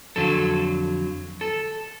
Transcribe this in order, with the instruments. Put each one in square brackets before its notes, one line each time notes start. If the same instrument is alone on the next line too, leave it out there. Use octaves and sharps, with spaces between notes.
[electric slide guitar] F2 D3 F#3 A4
A4